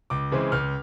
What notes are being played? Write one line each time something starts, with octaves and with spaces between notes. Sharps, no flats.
C#2 D6
C#3 E3 G#3 C4
C#2 F6